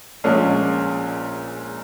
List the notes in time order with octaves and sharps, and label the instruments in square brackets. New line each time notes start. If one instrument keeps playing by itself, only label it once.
[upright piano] A#1 A#2 G#3 C#4